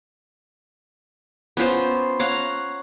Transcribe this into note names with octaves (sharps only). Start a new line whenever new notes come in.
B3 C#4 F4 C5
C#5 F5 F#5 A#5